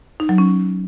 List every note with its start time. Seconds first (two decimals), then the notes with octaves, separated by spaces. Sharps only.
0.20 D#4
0.29 F#3
0.38 C#4